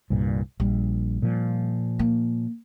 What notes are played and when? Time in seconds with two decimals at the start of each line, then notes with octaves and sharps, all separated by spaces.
0.10 C2 G2 A#2
0.60 A#1 G3
1.22 A#2 F3
1.99 A#3